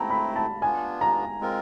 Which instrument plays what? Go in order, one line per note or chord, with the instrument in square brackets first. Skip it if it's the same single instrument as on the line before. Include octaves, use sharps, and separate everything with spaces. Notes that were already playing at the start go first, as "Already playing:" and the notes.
Already playing: [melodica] A3 C4 E4 [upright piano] A5 A#5
[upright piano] B5
A5
[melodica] B3 D4 F4 [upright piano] G#5
[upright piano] A#5
[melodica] G#3 C4 F4 A#4